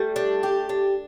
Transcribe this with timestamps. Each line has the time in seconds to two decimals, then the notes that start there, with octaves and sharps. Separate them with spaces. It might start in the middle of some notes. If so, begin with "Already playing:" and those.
Already playing: G3 A3
0.16 D4
0.43 G4
0.69 D4